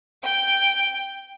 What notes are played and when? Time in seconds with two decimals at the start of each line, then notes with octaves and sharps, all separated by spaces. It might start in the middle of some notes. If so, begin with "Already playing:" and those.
0.23 G5